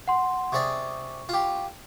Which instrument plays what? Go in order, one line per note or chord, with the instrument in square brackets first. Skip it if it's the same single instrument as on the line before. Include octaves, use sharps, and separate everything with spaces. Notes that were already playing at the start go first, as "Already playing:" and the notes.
[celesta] F#5 C6
[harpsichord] C3 G#4 D5 [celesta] C#6
[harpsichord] F4 G4